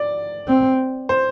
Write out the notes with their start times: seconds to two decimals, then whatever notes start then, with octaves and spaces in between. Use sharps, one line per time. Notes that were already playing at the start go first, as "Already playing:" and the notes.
Already playing: D5
0.48 C4
1.09 C5